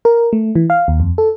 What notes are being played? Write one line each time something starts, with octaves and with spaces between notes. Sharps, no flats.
A#4
A3
E3
F5
D#2
F2
A4